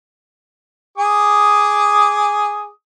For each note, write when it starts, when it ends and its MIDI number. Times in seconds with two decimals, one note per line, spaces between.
0.98 2.68 68
0.98 2.68 86
0.98 2.68 87